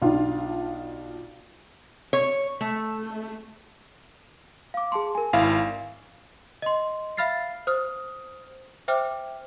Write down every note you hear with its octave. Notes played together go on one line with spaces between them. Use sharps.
B1 D4 F4
C#5
A3
F5 D6
G#4 A5 C6
A#4 G#5
G#1 E4 F5
D#5 C6
E5 F5 B5 F6 A6 C7
C5 D#6 F6
C5 E5 G5 D6 F6